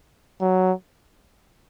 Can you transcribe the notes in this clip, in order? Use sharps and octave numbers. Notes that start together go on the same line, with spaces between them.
F#3